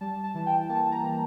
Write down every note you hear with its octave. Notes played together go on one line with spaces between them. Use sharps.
G3 A5
A5
E3
G5
A#3 A5
A#5
E3